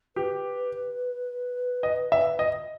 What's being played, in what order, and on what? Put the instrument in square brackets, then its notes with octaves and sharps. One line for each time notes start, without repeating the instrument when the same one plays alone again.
[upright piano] G4 [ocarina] B4
[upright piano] D#5
E5
D#5